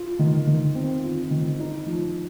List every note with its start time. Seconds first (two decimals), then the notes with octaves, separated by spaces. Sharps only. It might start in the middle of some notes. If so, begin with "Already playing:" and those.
Already playing: F4
0.19 D#3
0.47 D#3
0.75 C4
1.04 F4
1.31 D#3
1.59 D#4
1.86 F3